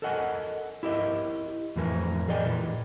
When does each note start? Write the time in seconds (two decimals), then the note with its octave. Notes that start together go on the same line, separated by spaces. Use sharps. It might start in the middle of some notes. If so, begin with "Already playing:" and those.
0.02 A4 A#4 D#5 F#5 G#5
0.83 E4 G4 A#4 D#5
1.76 F2 A2 E3 A#4 G#5
2.28 G#4 A#4 D5 D#5 G5 G#5
2.45 A#2 E3